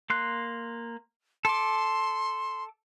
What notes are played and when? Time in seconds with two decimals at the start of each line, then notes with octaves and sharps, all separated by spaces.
0.10 A#3 C6 F#6
1.45 A4 C6 D6